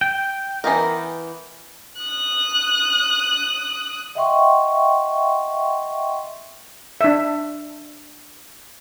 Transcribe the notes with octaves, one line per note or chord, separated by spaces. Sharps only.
G5
E3 B3 A#4
D#6 F#6
D#5 E5 F#5 G5 C6 C#6
D4 E5